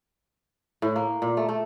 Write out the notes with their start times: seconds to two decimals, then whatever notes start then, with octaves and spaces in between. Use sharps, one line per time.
0.82 A2
0.96 A#3
1.22 A#2
1.37 A3
1.49 A3